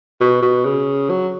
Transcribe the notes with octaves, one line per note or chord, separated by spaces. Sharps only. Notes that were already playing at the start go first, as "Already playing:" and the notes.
B2
B2
C#3
F#3